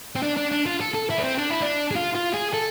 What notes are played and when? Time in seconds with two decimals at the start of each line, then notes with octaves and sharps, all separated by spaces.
0.16 C4
0.23 D4
0.37 D4
0.51 D4
0.66 F4
0.81 A4
0.94 A4
1.10 E4
1.18 B3
1.23 C4
1.38 D4
1.50 E4
1.61 D4
1.91 G#4
1.95 F4
2.15 F4
2.34 G#4
2.54 A4